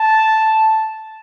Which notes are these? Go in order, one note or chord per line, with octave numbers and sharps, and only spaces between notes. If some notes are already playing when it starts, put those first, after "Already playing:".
Already playing: A5